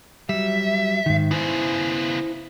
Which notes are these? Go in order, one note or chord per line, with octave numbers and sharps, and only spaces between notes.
F#3 G3 E5
G#2 D#3
C#3 B3 E4 C5